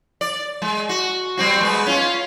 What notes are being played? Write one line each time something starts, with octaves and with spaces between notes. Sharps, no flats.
D5
G#3
F#4
G3 C4 F#4
G#3 B3
C#4 F4